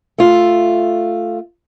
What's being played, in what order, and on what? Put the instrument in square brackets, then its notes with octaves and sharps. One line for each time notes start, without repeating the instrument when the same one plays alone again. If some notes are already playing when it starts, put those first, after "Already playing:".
[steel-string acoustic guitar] A3 F4